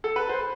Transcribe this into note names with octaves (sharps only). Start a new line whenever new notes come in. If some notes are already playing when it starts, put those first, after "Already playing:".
A4
B4
C5